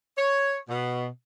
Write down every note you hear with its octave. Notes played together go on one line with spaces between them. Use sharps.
C#5
B2